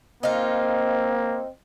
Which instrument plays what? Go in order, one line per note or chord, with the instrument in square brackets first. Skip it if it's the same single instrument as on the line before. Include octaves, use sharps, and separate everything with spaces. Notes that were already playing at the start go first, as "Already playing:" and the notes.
[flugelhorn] A#3 [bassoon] C4 [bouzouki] D#4 F4